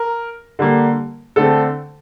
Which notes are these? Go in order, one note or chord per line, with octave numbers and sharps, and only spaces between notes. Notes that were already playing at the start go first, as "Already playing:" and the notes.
Already playing: A#4
D3 G3 A#3
D3 A3 C4 A4